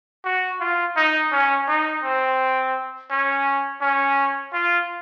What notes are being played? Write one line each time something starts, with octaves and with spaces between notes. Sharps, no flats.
F#4
F4
D#4
C#4
D#4
C4
C#4
C#4
F4